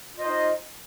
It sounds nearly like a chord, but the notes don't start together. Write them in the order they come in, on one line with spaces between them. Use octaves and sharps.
F4 D#5 C5 D#4